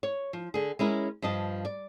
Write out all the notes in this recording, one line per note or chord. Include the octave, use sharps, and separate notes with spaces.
C#5
F3
D3 G#4
G#3 C#4 E4 A#4
G2 F3 D#5 A5
D5